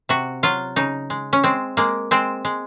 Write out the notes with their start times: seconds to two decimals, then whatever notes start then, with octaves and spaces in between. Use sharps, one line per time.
0.09 C3 F#4
0.43 F#3 F4
0.76 C#3 D#4
1.10 G#3
1.33 C#4
1.44 G#3 C4
1.77 G#3 A#3
2.11 G#3 C4
2.45 G#3